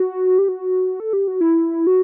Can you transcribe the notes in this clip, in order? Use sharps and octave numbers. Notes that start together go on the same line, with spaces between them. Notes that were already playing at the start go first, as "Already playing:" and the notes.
Already playing: F#4
G4
F#4
A4
G4
F#4
E4
F#4